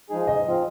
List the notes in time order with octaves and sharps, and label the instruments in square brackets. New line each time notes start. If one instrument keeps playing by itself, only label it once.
[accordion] F3 G#3 D#4 G#4
[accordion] G#2 [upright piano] D#5
[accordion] F3 C4 F4